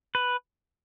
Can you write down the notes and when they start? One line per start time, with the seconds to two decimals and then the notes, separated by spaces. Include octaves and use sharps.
0.15 B4